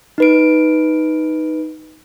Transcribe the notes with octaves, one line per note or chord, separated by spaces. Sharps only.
D#4 B4 D7